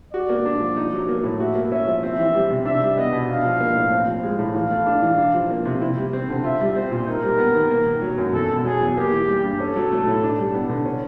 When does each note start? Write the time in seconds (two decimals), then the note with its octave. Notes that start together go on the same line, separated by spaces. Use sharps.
0.13 F#4 D5
0.29 A#3
0.45 D4
0.60 F3
0.77 D#4
0.93 F#3
1.09 A#3
1.23 A2
1.40 F#4 E5
1.55 A#3
1.71 C#4 E5
1.87 F3
2.03 C4 E5
2.18 E3
2.35 G3
2.50 C3
2.65 D4 E5
2.82 G3
2.97 B3 D#5
3.12 B2
3.28 D4 F5
3.45 F3
3.60 A#3
3.76 A2
3.92 C4
4.07 F3
4.23 G#3
4.39 A2
4.54 E3 F5
4.71 A3
4.86 D4
5.02 E3
5.18 D4
5.34 F3
5.50 A#3
5.65 C3
5.82 E4
5.97 G3
6.13 C4
6.29 D3
6.44 F4 E5
6.61 G3
6.75 C4 C5
6.91 A#2
7.07 D#4 A#4
7.23 G3
7.38 B3
7.54 D#3
7.71 A#3
7.86 D#3
8.02 F#3
8.18 F#2
8.33 E2 A4
8.50 B2
8.65 F#3 G#4
8.81 E2
8.96 A#3 G4
9.12 E3
9.28 G3
9.44 G2
9.60 C#4 A4
9.76 F#3
9.92 A3
10.07 A2
10.23 D4
10.39 G3
10.54 B3
10.70 D3
10.85 C#4